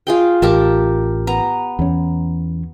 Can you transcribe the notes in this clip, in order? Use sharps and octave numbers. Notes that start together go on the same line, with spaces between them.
F4 G#4 G5
A1 G4 A#4 A5
B3 A#5
E2 C#4